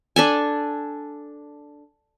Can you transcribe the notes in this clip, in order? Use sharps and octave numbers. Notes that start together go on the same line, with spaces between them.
D4 A4 G#5